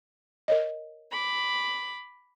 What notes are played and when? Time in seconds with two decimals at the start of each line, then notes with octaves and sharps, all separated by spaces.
0.48 A#4 C#5 D#5
1.10 B5 D6